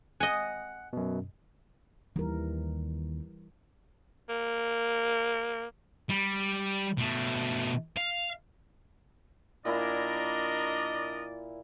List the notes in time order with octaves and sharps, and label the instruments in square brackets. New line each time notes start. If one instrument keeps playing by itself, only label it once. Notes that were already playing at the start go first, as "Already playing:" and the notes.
[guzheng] D#5 G#5 [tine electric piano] F#5
[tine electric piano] F#2 B2
[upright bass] D#2 [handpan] E3 G3 A#4
[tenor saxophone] A#3
[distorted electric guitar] G3
B2 A3
F5
[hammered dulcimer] A#2 E4 B5 [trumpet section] D4 A#4 [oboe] D5 [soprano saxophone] D#5